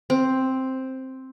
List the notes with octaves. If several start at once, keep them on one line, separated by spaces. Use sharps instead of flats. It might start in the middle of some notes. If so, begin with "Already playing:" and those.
C4